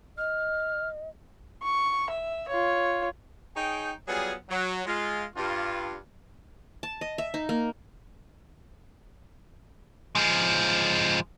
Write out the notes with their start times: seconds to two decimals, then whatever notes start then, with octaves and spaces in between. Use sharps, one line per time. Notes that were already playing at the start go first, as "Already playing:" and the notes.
0.18 D#5 F6
1.63 C#6
2.10 E5
2.48 F4 C#5
3.55 D#4 G#4 C#5 G5
4.07 F#3 G3 B3 F4 G#4
4.49 F#3
4.86 G#3 F4
5.36 G2 F4
6.83 A5
7.01 D#5
7.18 E5
7.34 D#4
7.49 A#3
10.15 F3 G#3